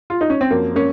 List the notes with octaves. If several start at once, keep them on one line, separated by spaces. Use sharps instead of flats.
F4
D#4
C#4
C4
F#2 F3 A#3
A#3 C#4